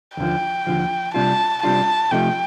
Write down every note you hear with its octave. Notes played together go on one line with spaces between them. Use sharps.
D#2 D3 F3 G5
D#2 D3 F3
C3 G3 D4 F4 A5
C3 G3 D4 F4 A5
C3 F3 A3 D#4 G4 G5